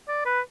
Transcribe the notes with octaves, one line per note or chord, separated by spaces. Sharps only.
D5
B4